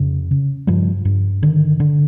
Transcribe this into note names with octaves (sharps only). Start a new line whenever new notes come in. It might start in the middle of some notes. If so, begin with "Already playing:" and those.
Already playing: F2 C#3
C#3
G2 F3 G3
G2
D3 D#3
D3